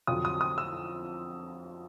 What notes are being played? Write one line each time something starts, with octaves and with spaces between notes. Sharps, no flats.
F2 D3 F#3 D#6
D#6
D#6
E6